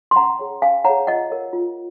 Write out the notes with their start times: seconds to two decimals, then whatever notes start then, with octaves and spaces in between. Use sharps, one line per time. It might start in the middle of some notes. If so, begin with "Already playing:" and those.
0.11 C6
0.16 C#4 F#5 A#5
0.39 G#4 C#5
0.62 C#4 F5 G#5
0.84 G#4 C#5 F#5 A#5
1.07 F4 D#5 F#5
1.30 A#4 C#5
1.53 F4